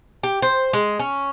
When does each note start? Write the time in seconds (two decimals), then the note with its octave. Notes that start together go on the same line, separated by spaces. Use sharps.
0.23 G4
0.42 C5
0.73 G#3
0.99 C#4